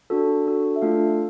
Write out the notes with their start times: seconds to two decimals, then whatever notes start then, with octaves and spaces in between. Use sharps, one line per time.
0.10 D4 F#4 A4
0.46 D4 F#4 A4
0.76 E5
0.82 A3 D4 F4 A4 F5